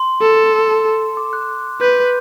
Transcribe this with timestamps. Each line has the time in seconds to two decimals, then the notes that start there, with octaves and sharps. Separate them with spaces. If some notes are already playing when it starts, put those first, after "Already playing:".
Already playing: C6
0.21 A4
1.17 D6
1.33 F#6
1.81 B4 G6